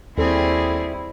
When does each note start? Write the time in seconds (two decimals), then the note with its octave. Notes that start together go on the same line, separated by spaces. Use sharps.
0.17 D#2 G3 C4 E4 G#4 A4